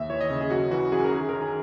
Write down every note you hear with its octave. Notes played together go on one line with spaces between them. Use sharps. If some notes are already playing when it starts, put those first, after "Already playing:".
Already playing: D#2 E5
E3 C#5
D#5
C#3
G#4
F#2 F#4
E3 F#4
F#2 G#4
A#4
D#3 G#4
D#3 A#4
G#4